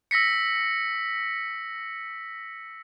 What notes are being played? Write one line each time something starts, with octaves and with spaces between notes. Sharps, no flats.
E6 A#6 B6 C#7